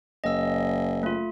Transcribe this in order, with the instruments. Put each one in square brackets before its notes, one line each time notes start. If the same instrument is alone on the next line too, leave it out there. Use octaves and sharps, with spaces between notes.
[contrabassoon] F#1 [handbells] D#5 E6
[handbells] A3 F4